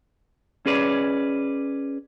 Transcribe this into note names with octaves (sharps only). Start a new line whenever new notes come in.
C#4 G#4 B4 D5